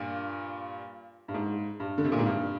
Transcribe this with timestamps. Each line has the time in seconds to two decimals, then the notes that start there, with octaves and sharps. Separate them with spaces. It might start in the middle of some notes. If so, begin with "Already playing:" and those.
Already playing: G2 A#2
1.28 G2
1.34 G#2
1.80 G2
1.98 D3
2.04 C3
2.12 A#2
2.18 G#2
2.26 G2